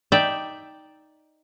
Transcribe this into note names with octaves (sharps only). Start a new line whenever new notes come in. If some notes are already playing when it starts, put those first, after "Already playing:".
D#4 D5 E5 G5